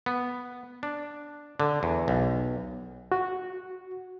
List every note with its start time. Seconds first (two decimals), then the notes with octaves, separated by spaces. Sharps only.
0.06 B3
0.83 D4
1.60 D3
1.83 E2
2.08 B1
3.12 F#4